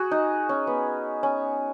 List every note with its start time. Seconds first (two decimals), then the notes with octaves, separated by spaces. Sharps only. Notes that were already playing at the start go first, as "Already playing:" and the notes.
Already playing: F#4 G#4
0.11 D#4
0.49 C#4
0.67 B3
1.23 C#4